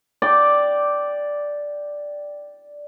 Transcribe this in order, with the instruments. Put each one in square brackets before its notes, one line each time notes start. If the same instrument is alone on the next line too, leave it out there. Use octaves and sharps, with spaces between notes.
[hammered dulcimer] D5 G5